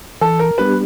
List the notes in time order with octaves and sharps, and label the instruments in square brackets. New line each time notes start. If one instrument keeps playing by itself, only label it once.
[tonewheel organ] E3 [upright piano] A4
[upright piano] A#4
[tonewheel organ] G3 B3 D4 G4 [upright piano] B4